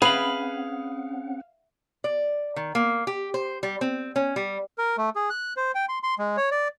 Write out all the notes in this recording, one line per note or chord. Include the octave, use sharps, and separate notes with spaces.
C4 C#4 G#4 B4 F5 F#5 B5
D5
D#3
A#3
G4
C5
G3
C4
C#4
G3
A#4
A3
G#4
F#6
C5
G5
C6
C6
G#3
C#5
D5